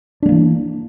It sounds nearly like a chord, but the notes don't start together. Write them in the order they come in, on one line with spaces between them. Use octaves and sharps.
D4 G#3 A#3 E3